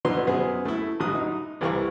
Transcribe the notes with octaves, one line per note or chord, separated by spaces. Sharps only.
B2 D3 F#3 B3 C6
F#2 B3 G#4 C5
A3 E4
A1 F#3 D#6
D#4
C2 E3 G4 A#4 F5 C#6